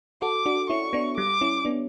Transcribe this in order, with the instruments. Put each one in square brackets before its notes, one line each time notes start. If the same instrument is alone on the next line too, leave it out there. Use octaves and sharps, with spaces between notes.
[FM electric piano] F#4 A4 [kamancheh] D6
[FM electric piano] D4 F#4
[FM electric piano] C#4 E4 [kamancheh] C#6
[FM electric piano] B3 D4
[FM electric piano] G3 [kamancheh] D6
[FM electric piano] C#4 E4
B3 D4